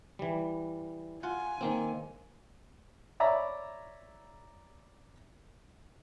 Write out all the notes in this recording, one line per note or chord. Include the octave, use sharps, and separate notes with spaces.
E3 G3
F4 F#5 G#5
D#3 A#3 C4
C#5 D5 E5 A#5 B5